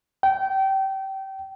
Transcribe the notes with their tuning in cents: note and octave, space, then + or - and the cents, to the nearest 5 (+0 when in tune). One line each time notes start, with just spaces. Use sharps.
G5 -25